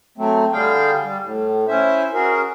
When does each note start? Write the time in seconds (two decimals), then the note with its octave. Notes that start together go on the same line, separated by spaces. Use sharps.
0.18 F#3 A3 C4
0.53 D3 G3 G#4 F5 G5
1.04 G3
1.22 A2
1.68 C#4 E4 C5 E5
2.14 C#4 F#4 G#4 A#4